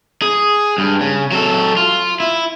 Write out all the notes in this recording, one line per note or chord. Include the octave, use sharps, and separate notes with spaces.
G#4
G2
C#3
F#3 A4
F4
E4